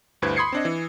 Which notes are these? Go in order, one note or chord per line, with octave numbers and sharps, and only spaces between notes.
D2 G2 E4 B4 C5 G#6
B5 C6 D#6 G#6 C7 C#7
C4 D4 D#5
E3